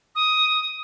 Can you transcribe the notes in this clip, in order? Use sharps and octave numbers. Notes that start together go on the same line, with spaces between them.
D#6